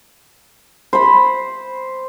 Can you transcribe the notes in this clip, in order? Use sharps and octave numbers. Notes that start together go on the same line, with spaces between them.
C5 B5